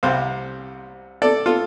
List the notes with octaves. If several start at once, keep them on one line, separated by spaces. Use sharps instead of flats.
C2 C3 G3 C5 F5
A4 D5
F4 A4